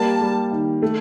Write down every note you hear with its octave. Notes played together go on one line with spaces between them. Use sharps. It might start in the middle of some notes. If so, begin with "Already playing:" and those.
Already playing: G3 A#3 A5
G3
D#3
A3